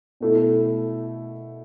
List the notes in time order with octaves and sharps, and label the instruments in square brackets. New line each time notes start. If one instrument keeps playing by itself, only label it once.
[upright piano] B2 A3 E4